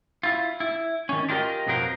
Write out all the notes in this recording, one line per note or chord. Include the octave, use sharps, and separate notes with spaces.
E4 F4
E4
D#3 C#4
D4 F4 G4 A#4 D#5
F2 B2 F3 F#3 A#4 C5